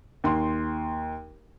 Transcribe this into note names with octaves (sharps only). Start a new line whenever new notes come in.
D#2 C6